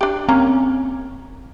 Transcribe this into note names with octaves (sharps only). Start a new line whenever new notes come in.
D4 G4
A#3 C4 C#4 A#5